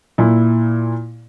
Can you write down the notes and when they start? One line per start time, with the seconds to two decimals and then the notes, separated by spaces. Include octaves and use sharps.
0.18 A#2 E4